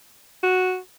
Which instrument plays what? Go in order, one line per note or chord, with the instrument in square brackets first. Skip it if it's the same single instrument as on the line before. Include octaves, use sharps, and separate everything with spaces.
[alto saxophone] F#4